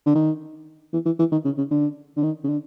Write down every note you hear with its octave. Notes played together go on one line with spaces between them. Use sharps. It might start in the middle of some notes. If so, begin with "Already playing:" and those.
D3
D#3
E3
E3
E3
D#3
C#3
C#3
D3
D3
D#3
C#3
D3